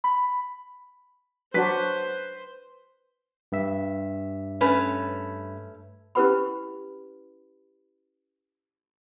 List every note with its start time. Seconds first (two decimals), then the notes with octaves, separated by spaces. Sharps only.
0.04 B5
1.54 F#3 D4 F#4 B4 C5 B6
3.52 G2 E5
4.61 A3 C#4 B4
6.15 C#4 E4 G4 B4 F#5 B5